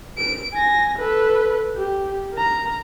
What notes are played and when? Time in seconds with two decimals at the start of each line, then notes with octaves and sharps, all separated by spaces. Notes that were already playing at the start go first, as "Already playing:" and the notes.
0.18 D7
0.54 G#5 A#6
0.98 A4 B4
1.77 G4
2.33 A#4 A#5